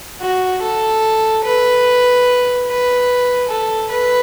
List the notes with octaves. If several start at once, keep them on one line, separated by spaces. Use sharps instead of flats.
F#4
A4
B4
B4
A4
B4